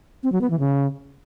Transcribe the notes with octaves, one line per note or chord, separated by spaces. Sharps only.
C4
F#3
B3
E3
C#3